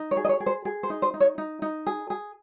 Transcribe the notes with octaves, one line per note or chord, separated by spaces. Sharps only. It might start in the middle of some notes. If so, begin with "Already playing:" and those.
Already playing: D#4
C#5
G#4
D#5
C#5
G#4
C5
G#4
C5
D#4
C5
D#4
C#5
D#4
D#4
G#4
G#4